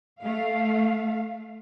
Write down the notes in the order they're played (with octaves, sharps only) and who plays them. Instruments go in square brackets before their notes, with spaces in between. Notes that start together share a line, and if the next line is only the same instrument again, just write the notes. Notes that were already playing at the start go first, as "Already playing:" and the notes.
[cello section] A3 F5